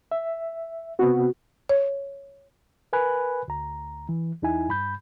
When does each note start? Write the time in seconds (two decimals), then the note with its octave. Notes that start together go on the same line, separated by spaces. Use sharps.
0.12 E5
0.99 C3 B3 C4 F#4
1.69 C#5
2.93 A#4 B4 G#5 B5 F#6
3.48 D2 A#5
4.09 E3
4.42 E2 D#4 E4 G#5
4.69 G2 B5 G6